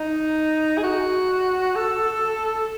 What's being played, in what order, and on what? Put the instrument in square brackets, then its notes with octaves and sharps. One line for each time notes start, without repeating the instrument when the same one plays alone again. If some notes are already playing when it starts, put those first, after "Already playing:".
Already playing: [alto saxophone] D#4
G#4
F#4
A4